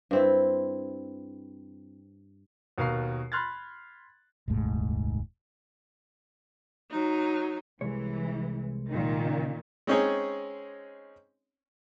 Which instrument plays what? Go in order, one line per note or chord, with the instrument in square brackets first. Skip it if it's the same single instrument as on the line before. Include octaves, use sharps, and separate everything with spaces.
[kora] G2 C4 E4
[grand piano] D#2 B2 A#4 F5 A#5 C7
B5 C6 F6 F#6 G#6 A6
[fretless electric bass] D#1 C2 G#2 A3
[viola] F#3 D#4
[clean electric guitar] C2 G#3 C#5 [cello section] E3
[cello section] A#2 D#3
[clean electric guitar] C#3
[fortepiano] G#3 C4 C#4 D#4 G#4 C#5